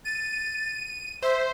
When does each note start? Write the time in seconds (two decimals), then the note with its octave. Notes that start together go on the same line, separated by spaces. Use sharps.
0.05 A6 D#7
1.23 C5 E5